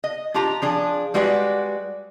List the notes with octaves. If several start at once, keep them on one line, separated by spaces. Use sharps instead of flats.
D#5
D4 F4 G4 A#5
F3 D4 G#4
G3 G#3 F#4 B4 D5